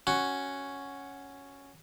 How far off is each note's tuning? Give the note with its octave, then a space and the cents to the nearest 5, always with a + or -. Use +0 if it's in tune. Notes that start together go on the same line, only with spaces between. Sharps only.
C#4 +0 F#4 +0